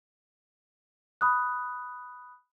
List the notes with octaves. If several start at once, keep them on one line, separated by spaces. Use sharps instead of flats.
B5 D#6 F#6